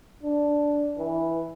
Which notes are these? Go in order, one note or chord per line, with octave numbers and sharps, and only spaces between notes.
D4
E3